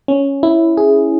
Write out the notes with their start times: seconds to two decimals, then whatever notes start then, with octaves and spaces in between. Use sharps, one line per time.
0.08 C#4
0.43 E4
0.77 G#4